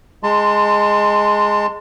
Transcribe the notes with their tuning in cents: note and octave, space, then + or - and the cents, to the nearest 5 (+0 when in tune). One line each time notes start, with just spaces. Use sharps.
G#3 +0 A5 +30 C6 +0